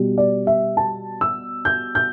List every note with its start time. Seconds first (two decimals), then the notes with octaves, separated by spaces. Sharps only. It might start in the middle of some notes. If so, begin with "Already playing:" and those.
Already playing: B2 G3
0.18 D5
0.47 E5
0.77 A5
1.21 E6
1.65 G6
1.95 G6